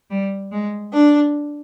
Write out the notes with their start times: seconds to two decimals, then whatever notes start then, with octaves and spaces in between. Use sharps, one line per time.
0.11 G3
0.52 G#3
0.93 D4